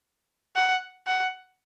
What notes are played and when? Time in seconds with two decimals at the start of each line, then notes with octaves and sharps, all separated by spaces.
0.56 F#5
1.07 F#5